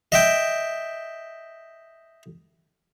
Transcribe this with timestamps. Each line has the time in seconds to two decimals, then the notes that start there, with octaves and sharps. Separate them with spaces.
0.12 D#5 E5 G5